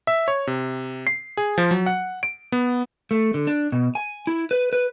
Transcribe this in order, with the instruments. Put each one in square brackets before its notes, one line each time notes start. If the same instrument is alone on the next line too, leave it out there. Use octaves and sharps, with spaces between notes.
[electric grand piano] E5
C#5
C3
C7
G#4
F3
F#3
F#5
D7
B3
[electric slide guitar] A3
D3
D4
B2
G#5
E4
B4
B4